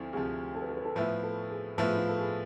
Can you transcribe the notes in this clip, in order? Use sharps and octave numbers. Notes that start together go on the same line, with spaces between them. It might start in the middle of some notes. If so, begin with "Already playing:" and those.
Already playing: D2 F3 C4 E4
D2 C3 F3 G#4
A4
B4
A4
B4
A4
A2 F3 B3 E4
A4
G#4
A2 F3 B3 E4 F4
G#4
F4
A4
G#4